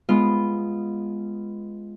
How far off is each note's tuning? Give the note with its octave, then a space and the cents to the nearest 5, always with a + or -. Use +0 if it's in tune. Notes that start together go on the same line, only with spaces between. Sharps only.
G#3 +0 B3 +0 F4 -15